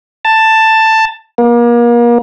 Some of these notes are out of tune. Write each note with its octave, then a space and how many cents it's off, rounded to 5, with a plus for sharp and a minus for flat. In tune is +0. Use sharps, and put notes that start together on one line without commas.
A5 +10
A#3 +35